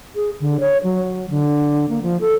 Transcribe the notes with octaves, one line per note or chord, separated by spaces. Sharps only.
G#4
D3
C#5
F#3
D3
A#3
F3
A4